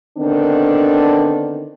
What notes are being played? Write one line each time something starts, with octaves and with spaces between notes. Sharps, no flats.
D3 D#3 B3 C4 D4